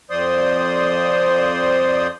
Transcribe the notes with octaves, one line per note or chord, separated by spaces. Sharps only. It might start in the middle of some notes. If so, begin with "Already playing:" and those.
F2 F3 C5 D5 C6 D#6